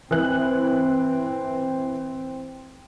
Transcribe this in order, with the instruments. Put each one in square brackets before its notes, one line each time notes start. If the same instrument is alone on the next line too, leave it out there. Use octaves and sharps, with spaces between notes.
[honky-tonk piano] E3 F#6 [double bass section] C4